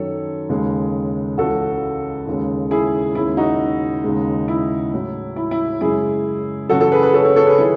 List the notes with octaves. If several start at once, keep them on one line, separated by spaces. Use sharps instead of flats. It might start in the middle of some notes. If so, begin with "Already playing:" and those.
Already playing: F#2 D#3 F#3 A4 C#5
D#2 C#3 G#3
C#2 C#3 E3 F#4 A4
D#2 C#3 G#3
E4 G#4
D#2 C#3 G#3 E4
D#4 F#4
D#2 C#3 G#3
E4
A2 F#3
E4
E4
F#2 C#3 G#3 E4 G#4
F#2 C#3 E3 F#4 A4
F#4 A4
G#4 B4
G#4 B4
A4 C#5
A4 C#5
A4 C#5
G#4 B4
D#3 F#3 E4 G#4